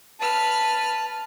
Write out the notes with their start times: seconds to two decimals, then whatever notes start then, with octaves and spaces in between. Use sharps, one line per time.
0.20 B4 A5 F6